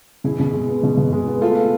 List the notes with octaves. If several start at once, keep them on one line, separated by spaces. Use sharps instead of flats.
B2 E4 G#4
B2
G#3
B3
B2
B2
G#3
B3
A3 F4 A4